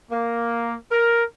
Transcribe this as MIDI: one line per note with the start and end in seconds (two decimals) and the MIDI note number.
0.12 0.75 58
0.92 1.23 70